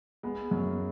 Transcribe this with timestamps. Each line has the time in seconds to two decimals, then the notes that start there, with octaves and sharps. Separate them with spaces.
0.23 G#3 B3
0.51 F#2